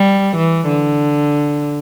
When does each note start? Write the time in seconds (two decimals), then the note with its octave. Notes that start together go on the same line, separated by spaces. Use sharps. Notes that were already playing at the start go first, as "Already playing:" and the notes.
Already playing: G3
0.37 E3
0.68 D3